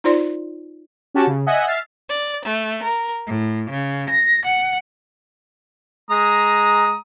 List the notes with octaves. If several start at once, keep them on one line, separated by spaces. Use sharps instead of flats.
D#4 F4 C5 D5 C6
C#4 F#4 G4 A5
C#3
D#5 E5 F#5 G#5
E5 F6 A6 C7
D5
A3
A#4
A2
C#3
A#6
F#5
G#3 A#5 D#6